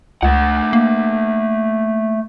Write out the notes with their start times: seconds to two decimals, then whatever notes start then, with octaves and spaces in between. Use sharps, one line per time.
0.23 C#2 A3 F#5
0.73 A#3